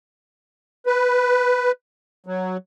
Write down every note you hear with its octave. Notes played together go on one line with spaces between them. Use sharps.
B4
F#3